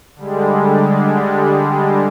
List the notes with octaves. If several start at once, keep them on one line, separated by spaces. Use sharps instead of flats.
D3 G3 G#3